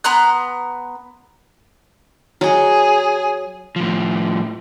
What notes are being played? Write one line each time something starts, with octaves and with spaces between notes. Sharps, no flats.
B3 A#5 C6 F#6
F#3 G#4 D#5
A2 F3